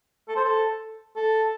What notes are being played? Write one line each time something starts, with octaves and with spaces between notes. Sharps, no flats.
A4
C5
A4
A4